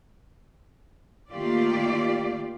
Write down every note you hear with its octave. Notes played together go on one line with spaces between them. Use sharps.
D#3 A3 A#3 F4 G4 D5